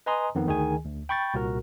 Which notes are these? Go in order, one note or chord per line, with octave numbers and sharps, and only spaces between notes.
B4 D#5 G#5 A#5 C6 D#6
F2 D#3 B3 D#4
D2 D#3 G#4 G#5
D2
G5 B5 C#6 G6 A6
C2 A#2 F#4 A#4